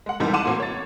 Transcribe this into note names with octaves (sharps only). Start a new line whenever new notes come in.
G#3 F#5
F2 C3 D#3 E3 G3 G#3
F#5 A5 C6 D6 D#7 E7
A#2 E3 A3 A#3 C4 F#4
C#5 A6